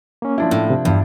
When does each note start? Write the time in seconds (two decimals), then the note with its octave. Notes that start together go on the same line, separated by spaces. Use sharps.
0.22 A#3 C#4
0.38 F3 D4 E4
0.51 A2
0.70 C3
0.85 E2 G2